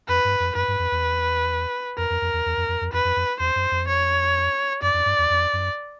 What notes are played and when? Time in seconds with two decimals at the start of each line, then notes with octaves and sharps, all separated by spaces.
0.08 F2 B4
0.25 G2
0.40 F2
0.55 F#2 B4
0.68 G2
0.79 F2
0.92 E2
1.98 F2 A#4
2.10 F2
2.22 F2
2.33 E2
2.46 E2
2.57 F2
2.68 F2
2.81 F2
2.93 F2 B4
3.05 F2
3.16 F2
3.40 E2 C5
3.56 F#2
3.71 F2
3.88 C#5
4.82 F#2 D5
4.94 F2
5.06 G2
5.18 E2
5.30 F2
5.53 F#2